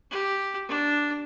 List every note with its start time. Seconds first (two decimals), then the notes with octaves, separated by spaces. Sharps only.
0.11 G4
0.68 D4